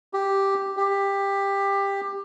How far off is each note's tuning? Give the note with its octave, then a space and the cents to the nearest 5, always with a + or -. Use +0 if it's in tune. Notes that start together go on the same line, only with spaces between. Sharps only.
G4 +0
G4 +15